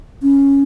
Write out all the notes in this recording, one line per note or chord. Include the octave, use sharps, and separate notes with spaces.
C#4